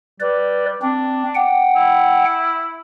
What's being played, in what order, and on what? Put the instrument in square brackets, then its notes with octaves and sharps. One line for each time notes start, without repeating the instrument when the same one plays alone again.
[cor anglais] G3 [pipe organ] B4 D5
[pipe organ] C4 [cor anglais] D4
[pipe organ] F#5 G5
[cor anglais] E4